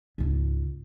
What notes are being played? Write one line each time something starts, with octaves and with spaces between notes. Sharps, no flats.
C#2 G#2